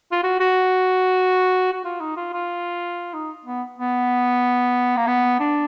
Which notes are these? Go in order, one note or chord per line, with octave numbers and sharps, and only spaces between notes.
F4
F#4
F#4
F#4
F4
D#4
F4
F4
D#4
B3
B3
A#3
B3
D4